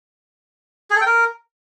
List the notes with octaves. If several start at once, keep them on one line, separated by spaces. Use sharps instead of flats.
G#4
A4
G5
A#4